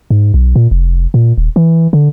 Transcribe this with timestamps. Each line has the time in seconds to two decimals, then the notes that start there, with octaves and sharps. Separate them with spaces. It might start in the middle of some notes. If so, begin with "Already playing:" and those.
0.10 G#2
0.34 B1
0.56 A#2
0.71 F1
1.14 A#2
1.38 D#1
1.56 E3
1.93 D3